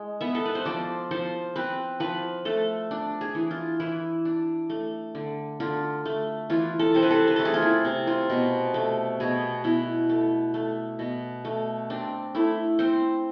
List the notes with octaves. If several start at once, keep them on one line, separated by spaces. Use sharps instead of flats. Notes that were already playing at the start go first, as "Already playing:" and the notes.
Already playing: G#3
B3 E5
A4
B4
C5
F3 D5
F3 C5
C4 B4
F3 B4
A3 A4
D4
G#4
E3
F4
E3 E4
D4
A3
D3
D3 F4
A3
E3 F4
A4
C3 C5
B4
A4
B4
A3 A4
G#4
F4
E4
C3
F4
B2
A3
B2 G#4
B2 E4
A3
A3
B2
A3
C4 D4
A3 E4
C4 C5